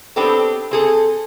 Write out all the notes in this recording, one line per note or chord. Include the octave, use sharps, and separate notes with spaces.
B3 C4 D4 G4 A4
C4 G#4 A4